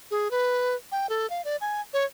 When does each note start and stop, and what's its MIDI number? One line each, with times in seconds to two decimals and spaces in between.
0.11 0.31 68
0.31 0.75 71
0.92 1.09 79
1.09 1.29 69
1.30 1.44 77
1.45 1.57 74
1.61 1.81 80
1.93 2.05 73